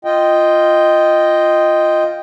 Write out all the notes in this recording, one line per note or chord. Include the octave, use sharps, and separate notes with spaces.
F4 D#5 G5